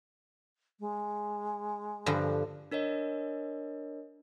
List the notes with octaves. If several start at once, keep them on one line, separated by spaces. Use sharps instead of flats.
G#3
G2 D3 F3
D4 A#4 C#5 D#5